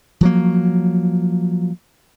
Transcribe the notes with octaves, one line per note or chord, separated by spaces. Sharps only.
F3 F#3 A#3